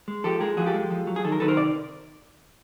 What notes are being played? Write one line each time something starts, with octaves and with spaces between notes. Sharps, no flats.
G#3
F3 G4 A4
G#3 G#4 A#4
F3 F#4 G#4
G4 A4
G#3
F3
F#3
G#4
D#3 A4
A#4
D#3 A4 B4
A#4 C5
C3 D5